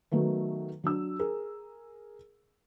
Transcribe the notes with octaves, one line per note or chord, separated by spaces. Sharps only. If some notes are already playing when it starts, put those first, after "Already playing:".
D#3 F#3 A3 B3
F#3 D4 E6
G#4 A#4